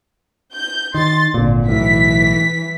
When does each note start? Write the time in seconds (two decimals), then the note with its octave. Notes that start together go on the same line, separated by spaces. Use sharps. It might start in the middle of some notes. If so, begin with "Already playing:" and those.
0.54 G6
0.94 D#3 C6 A6
1.34 G#1 A#2 D3
1.69 B1 A2 E3 B6